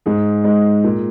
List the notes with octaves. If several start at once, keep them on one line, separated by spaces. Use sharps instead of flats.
G#2 G#4
G#3 D#4
A#2